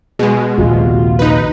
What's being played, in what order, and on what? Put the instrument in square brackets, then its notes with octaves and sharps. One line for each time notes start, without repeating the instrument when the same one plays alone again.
[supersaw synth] B2 G#3 [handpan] G#4
[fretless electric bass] A#1 D#2 C3 [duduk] F4 [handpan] F#4
[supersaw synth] D#4 B4